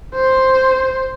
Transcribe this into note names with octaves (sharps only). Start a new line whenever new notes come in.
C5